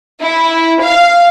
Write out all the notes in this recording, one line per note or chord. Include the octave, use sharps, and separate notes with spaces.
E4
F5